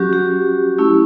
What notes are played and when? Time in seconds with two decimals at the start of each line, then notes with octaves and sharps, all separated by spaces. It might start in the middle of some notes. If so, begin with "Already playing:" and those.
Already playing: F#3 C#4 F#4 G4
0.13 G4
0.78 A3 C#4 E4